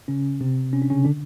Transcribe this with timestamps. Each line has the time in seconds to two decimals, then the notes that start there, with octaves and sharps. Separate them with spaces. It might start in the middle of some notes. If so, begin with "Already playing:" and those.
0.08 C#3 C#4
0.41 C3 C4
0.73 C#4
0.82 D4
0.90 C#3 C#4
1.05 D3 D4